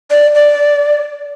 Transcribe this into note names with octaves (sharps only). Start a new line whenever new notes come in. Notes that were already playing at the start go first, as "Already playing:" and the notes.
D5
D5